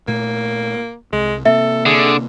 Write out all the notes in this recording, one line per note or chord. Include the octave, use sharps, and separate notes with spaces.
A#2 A3 A#3
C2 G#3
C3 A#3 C4 A4 E5
D3 G#4